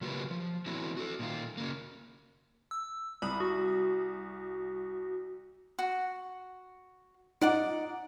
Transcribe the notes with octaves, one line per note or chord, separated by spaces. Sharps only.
C#3 F#3 A#3 F4 G4 B4
F3
E3 F#3 A3 B3 C4 E4
F#4 A4
A#2 D#3 F4
C#3 A#3
E6
C2 B5 D#6
F#4
F#4
D#4 D5 F#5 D6